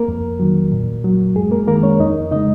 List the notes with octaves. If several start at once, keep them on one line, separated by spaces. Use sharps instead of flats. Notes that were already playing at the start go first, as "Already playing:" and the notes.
Already playing: A#3 A#4
F2
D#3 F#3
A#2
F#3
F#2 G#3 G#4
A#3 A#4
D#3 G#3 A#3 A#4
C#4 C#5
F2 D#4 D#5
C#3 G#3 D#4 D#5